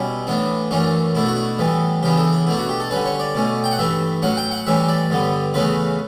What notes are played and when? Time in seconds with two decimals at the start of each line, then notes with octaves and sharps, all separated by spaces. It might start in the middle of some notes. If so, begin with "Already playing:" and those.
Already playing: B2 G3 C#4 E4
0.27 A2 E3 B3 D4
0.71 F#2 E3 A3 C#4 D4
1.15 B2 A3 D4 E4
1.26 F#4
1.36 E4
1.58 A2 E3 G3 B3
2.03 C#3 E3 B3 D4 G4
2.17 A4
2.33 E4
2.47 B2 A3 D4 E4
2.58 F#4
2.69 G4
2.80 A4
2.91 D3 G3 C#4 B4
3.06 C#5
3.20 D5
3.35 B2 A3 C#4
3.64 G5
3.71 F#5
3.79 G2 E3 A3 E5
4.22 A2 F#3 C#4 F#5
4.37 G5
4.52 F#5
4.67 A2 E3 G3 C#4 E5
4.88 D5
5.10 G2 D3 G3 B3
5.54 E2 C#3 E3 A3 C#4 B4